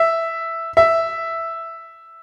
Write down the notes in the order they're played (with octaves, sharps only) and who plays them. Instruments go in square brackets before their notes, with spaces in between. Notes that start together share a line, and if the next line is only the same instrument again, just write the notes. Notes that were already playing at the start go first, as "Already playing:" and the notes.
Already playing: [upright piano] E5
E5